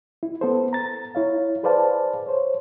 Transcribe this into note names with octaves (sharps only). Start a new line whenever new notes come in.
E4
B3 A4 C5
A#5 A6
E4 C#5 F5
G#4 B4 C5 D5 F5 A5
C5 C#5